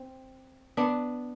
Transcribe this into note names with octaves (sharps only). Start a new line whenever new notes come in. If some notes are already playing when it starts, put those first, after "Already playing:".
Already playing: C4
B3 D4